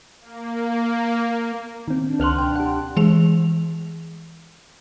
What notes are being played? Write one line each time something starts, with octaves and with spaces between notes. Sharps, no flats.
A#3
D#3 C4
D4
C#2 A#4 F#5 C6 F6 F#6
B1 D4 G5
G4 F#5
E3 G#3 G#4 F7